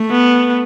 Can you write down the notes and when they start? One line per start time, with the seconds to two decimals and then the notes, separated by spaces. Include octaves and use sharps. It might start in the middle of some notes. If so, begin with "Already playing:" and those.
Already playing: A3
0.11 B3